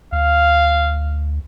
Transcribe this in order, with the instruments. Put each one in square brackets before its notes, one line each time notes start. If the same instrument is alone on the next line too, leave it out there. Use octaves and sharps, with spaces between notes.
[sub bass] D2 [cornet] F5